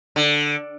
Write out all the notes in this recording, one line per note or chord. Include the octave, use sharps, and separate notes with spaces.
D3